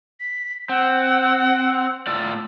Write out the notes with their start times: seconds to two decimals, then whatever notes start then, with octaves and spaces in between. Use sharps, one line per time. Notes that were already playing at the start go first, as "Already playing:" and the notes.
0.20 B6
0.69 C4 F#5
2.07 A2 F4 D5 E6